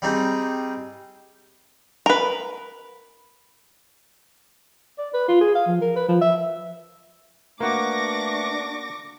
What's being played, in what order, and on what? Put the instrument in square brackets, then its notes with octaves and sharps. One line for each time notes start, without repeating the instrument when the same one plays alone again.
[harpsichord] G3 C4 D#4 G#4
[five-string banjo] A#4 B4
[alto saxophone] D5
B4
F4
G#4
F5
F3
A#4
B4
F3
E5
[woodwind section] A3 B4 [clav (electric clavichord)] A#3 F#4 [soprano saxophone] D4 [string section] C#6 D6 A#6